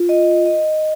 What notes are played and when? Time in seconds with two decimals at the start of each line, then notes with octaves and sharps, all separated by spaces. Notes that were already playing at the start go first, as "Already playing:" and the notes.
Already playing: F4
0.09 D#5
0.46 D#5